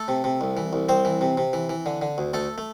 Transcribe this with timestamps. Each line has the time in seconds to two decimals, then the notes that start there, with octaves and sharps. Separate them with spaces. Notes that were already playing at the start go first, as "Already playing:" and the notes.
Already playing: A3 A4
0.08 C3
0.24 C3
0.41 C2
0.57 E3
0.73 C2
0.89 C2 C4 C5
1.05 E3
1.21 C3
1.37 C3
1.53 E3
1.69 E3
1.86 D3
2.02 D3
2.18 D2
2.33 D2 A3 A4
2.58 A3